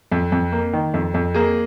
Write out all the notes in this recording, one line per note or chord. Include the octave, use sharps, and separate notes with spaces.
F2
F2
A#3
D#3
F2
F2
A#3 G#4